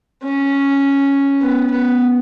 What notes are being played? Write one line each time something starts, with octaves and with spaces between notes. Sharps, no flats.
C#4
B3
B3